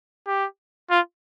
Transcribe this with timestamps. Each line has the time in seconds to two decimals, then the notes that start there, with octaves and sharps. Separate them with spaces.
0.27 G4
0.90 F4